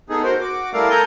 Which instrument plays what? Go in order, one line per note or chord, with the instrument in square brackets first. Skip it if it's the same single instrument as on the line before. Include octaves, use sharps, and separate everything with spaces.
[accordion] A3 B3 D#4 G#4
F#4 A#4 C5
F#4 D6
G3 A3 E4 A#4 D5 F5
A4 A#4 G#5 A#5 G6